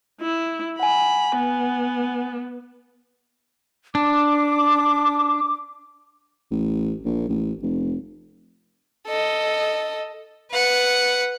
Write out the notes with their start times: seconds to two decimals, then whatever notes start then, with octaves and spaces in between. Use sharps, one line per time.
0.20 E4
0.80 F#5 G#5 B5
1.37 B3
3.95 D4 D6
6.51 A1
7.05 A#1
7.29 A1
7.63 F1
9.08 A4 D#5
10.51 B4 F#5